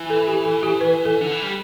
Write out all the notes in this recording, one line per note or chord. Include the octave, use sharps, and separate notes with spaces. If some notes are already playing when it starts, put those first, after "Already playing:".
Already playing: E3
A4
G4
A4
G4
B4
A4
D3
E3
G3